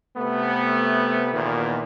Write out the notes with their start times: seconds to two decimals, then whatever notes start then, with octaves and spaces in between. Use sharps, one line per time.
0.17 C3 A3 B3
1.33 E2 A#2 D#3